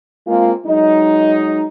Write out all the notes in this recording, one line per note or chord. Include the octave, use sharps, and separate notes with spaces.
G#3 A#3 C4 F4
F#3 G#3 D#4